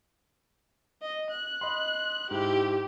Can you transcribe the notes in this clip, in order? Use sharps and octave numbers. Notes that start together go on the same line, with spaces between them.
D#5
F#6
D#5 B5 C6
G#2 E4 G4